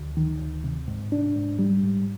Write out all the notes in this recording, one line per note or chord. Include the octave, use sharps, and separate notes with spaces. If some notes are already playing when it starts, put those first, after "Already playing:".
Already playing: D2
D#3
D2
C3
G#2
D4
G#2
G3
G#2